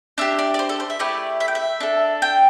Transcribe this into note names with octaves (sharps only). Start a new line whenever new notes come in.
D4 G4 E5
D5
D5
C5
A4
C5
E5
A3 E4 G4 D5
E5
G5
E5
D4 A4
G5